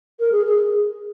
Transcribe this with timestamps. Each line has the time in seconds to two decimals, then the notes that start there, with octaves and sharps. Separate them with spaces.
0.20 A#4
0.32 G#4
0.46 G#4